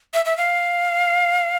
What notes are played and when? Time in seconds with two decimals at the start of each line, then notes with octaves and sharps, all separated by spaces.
0.14 E5
0.25 E5
0.37 F5